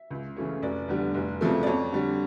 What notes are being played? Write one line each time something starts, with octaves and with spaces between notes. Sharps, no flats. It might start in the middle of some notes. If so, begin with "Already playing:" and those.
Already playing: E5
C#2
C#3 E3 A3 C#4
F1 D5
E2 D3 G3
F1
F2 C#3 F3 A3
D5
F2 C#5
D3 G3